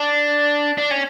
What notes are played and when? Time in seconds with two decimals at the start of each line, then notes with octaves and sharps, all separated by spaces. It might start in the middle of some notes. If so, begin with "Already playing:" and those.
Already playing: D4
0.78 D4
0.91 C#4